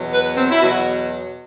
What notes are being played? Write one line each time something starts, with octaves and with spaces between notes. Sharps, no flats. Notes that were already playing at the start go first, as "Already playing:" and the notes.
Already playing: E2 B2 F#3
B4
C4
E4
E2 B2 F#3 F#4